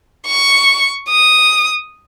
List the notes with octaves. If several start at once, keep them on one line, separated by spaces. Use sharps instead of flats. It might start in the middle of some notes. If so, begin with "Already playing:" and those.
C#6
D#6